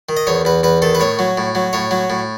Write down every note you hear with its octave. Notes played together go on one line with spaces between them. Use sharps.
D#3
D#5
E2 C#5
E2 B4
E2 B4
D#3 A4
B4
A2 C#5
F#3
A2
F#3
A2 C#5
F#3
A2